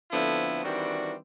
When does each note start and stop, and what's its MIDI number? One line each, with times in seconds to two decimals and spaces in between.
0.11 0.60 50
0.11 0.60 53
0.11 0.60 57
0.11 0.60 59
0.11 0.60 60
0.11 0.60 64
0.64 1.14 51
0.64 1.14 52
0.64 1.14 55
0.64 1.14 60
0.64 1.14 62
0.64 1.14 66